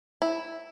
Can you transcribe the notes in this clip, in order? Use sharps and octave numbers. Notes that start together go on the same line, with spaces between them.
E4